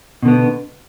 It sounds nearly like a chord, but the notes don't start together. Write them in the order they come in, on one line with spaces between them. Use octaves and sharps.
B2 D3 B3